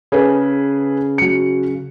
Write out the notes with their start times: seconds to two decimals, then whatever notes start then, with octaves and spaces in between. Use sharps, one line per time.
0.12 C#3 G#4 A4 B4
1.18 F#3 C#7